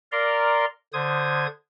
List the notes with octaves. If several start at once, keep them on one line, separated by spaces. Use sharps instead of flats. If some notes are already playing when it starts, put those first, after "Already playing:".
A#4 D5 F5 A#5 C6
D3 C5 D#6 G#6